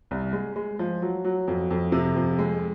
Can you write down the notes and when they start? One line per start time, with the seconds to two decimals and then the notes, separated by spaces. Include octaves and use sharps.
0.11 C2
0.33 G#3
0.56 G#3
0.79 F3
1.02 F#3
1.25 F#3
1.48 F2
1.71 F2
1.92 C3
2.16 F2
2.39 G#3